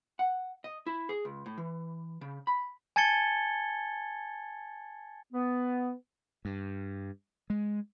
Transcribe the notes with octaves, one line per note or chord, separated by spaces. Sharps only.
F#5
D#5
E4
G#4
C#2
A2
E3
C#3
B5
G#5 A5 G#6 A6 C#7 G7
B3
G2
G#3